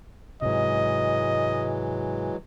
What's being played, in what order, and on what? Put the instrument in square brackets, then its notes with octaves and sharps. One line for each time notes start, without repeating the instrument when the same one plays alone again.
[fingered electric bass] G#2 C3 [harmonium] E3 F#3 G#3 [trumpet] D#5